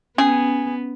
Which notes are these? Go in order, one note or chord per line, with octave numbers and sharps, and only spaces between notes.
B3 C#4 G#4